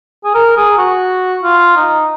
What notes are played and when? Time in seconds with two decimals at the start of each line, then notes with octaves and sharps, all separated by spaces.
0.25 G#4
0.35 A#4
0.57 G#4
0.78 F#4
1.44 F4
1.77 D#4